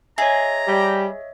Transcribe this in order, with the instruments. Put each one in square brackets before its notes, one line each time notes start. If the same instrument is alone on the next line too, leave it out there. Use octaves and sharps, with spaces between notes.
[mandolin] G#4 [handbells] C#5 D#5 E5 [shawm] A#5
[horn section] G3 G4